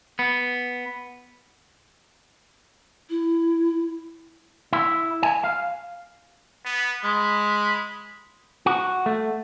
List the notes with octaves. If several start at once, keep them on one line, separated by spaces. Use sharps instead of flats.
B3
E4
E4
G#5
F5
B3
G#3 B5
F#4
A3